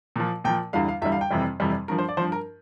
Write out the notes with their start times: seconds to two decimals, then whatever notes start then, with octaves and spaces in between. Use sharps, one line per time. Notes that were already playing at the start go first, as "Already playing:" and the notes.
0.16 A#2 F3
0.44 A#2 F3 G5
0.73 E2 D3 G3 F5
0.88 F5
1.02 E2 D3 G3 E5
1.12 F5
1.21 G5
1.30 F2 C3 E3 G3
1.60 F2 C3 E3 G3
1.88 G2 F3 A#4
1.99 C5
2.08 D5
2.17 G2 F3 C5
2.32 A#4